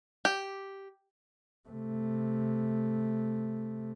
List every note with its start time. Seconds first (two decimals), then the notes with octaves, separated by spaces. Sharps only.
0.25 G4
1.69 C3 A3